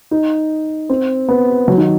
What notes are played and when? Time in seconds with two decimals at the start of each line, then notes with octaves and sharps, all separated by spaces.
0.11 D#4
0.89 C4
1.29 B3
1.68 F#3
1.78 D#3